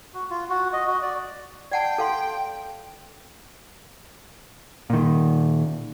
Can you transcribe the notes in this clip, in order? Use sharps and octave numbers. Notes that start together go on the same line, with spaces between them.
F#4
F4
F#4
D#5
F#4
D5
D5 F#5 G5 A5
A4 F5 C6
A#2 D#3